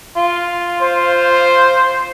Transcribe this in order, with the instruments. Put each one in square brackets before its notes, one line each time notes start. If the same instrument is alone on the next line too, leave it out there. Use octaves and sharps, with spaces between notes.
[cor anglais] F4
[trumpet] C5